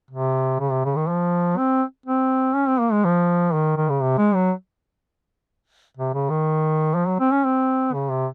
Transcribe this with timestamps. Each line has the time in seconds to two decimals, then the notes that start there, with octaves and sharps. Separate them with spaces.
0.11 C3
0.60 C#3
0.71 C3
0.85 C#3
0.96 D#3
1.09 F3
1.58 C4
2.06 C4
2.55 C#4
2.68 C4
2.80 A#3
2.92 G#3
3.05 F3
3.54 D#3
3.77 D#3
3.89 C#3
4.02 C3
4.18 G#3
4.35 F#3
5.97 C3
6.14 C#3
6.30 D#3
6.95 F3
7.08 F#3
7.20 C4
7.32 C#4
7.45 C4
7.94 C#3
8.10 C3